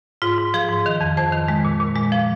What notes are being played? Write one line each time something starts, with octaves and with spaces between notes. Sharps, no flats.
G#2 F4
G#2
F3 G#4
G#2
D#3
F2
F2 C5
D#3
G#3
A#2
A#2
G#3
F3